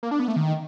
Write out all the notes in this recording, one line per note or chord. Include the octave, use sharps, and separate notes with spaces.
A#3
D4
B3
A3
D#3